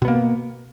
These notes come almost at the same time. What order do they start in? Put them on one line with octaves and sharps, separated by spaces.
B2 B3 A#3